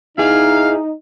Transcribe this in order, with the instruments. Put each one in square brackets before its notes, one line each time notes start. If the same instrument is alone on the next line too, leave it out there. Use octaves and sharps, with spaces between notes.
[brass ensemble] D#4 [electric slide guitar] E4 G#4 [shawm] F5